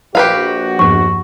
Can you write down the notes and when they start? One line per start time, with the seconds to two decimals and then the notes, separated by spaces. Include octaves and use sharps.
0.15 A#1 F#4 G4 B4 F5
0.79 E2 G2 F3 C#6